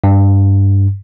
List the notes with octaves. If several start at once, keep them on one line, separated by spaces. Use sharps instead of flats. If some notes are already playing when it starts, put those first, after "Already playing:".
G2